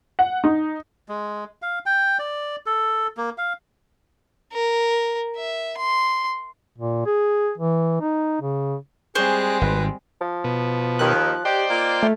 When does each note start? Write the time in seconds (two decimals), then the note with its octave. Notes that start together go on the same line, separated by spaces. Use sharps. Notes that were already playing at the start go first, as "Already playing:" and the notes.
0.19 F#5
0.44 D#4
1.09 G#3
1.62 F5
1.86 G5
2.19 D5
2.66 A4
3.17 A#3
3.38 F5
4.53 A#4
5.36 E5
5.77 C6
6.78 A#2
7.06 G#4
7.58 E3
8.01 D#4
8.41 C#3
9.15 G3 G#3 C4 G#4 C5 C#6 F#6
9.61 G#1 B4
10.21 F3
10.44 B2
10.99 D#2 D#3 F#6
11.45 D#4 G4 C5 D5 G5
11.69 A#3 F4
12.03 A3